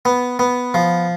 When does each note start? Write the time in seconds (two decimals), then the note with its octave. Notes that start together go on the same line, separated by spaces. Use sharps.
0.05 B3
0.39 B3
0.74 F3